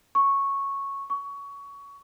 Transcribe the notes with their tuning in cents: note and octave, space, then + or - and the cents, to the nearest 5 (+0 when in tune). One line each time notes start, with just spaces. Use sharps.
C#6 -5
C#6 +20